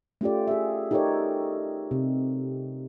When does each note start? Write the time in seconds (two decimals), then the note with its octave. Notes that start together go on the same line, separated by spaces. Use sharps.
0.21 A3 C#4 F4 G4 D5
0.48 G#4 E5
0.91 D#4 G4 A4 A#4 C#5 D5
1.91 C3